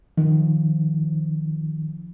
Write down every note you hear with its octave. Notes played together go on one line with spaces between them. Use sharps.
D#3 F3